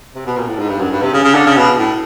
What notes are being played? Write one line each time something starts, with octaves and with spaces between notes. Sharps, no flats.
C3
B2
A#2
A2
G#2
G2
F#2
G2
C3
C#3
C#3
D3
C#3
B2
A2